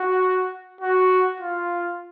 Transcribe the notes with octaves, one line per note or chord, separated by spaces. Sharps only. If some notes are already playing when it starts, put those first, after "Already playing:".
Already playing: F#4
F#4
F4